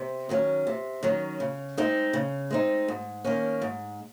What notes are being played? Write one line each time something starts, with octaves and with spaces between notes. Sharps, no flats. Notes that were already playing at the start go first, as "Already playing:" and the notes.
Already playing: C3
D#3 F#3 C#4
C3
D#3 F#3 C#4
C#3
G#3 C4 D#4
C#3
G#3 C4 D#4
G#2
D#3 A#3 C#4
G#2